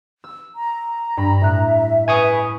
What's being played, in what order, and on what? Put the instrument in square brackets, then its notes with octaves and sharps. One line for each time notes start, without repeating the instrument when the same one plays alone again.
[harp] E6
[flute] A#5
[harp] G2 B5
[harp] A2 E4 F#6 [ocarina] E5
[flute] B4 [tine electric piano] G#5 C#6 D#6